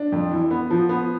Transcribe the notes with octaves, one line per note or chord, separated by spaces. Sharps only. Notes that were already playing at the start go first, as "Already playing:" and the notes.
Already playing: D4
F2
E3
B3
F3
B3